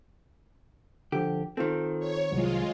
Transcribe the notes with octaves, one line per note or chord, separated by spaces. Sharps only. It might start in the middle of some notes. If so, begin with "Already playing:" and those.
D3 F3 G4
D#3 C4 F4 A4
C#5
C2 F#3 G#3 F4